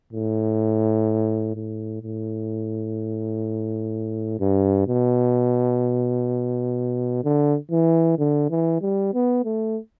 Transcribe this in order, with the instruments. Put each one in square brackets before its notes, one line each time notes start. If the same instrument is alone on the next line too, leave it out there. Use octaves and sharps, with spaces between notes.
[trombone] A2
A2
A2
G2
B2
D3
E3
D3
E3
G3
B3
A3